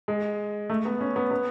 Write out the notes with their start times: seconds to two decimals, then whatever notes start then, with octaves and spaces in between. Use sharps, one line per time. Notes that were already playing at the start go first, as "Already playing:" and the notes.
0.08 G#3
0.70 A3
0.85 B3
1.00 C#4
1.16 B3
1.31 B3